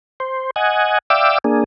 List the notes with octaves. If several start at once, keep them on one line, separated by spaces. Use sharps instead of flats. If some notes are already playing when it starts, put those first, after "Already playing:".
C5
D#5 F#5 G#5
D5 E5 F5 G5 D6 E6
A#3 D4 G#4